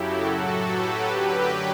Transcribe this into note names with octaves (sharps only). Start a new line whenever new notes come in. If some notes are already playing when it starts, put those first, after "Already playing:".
Already playing: F#2 C#3 F#3 E4 F#4 G4 A4
A2 F#3
G4 B4
F#2 D3 F#3